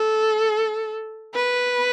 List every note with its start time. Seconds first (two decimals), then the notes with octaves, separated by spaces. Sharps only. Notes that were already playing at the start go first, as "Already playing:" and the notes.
Already playing: A4
1.35 B4